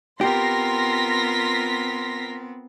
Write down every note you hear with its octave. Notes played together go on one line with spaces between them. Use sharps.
B3 C4 F4 G4 A#4 C6 A#6 B6